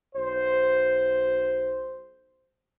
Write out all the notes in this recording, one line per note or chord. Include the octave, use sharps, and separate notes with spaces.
B1 C5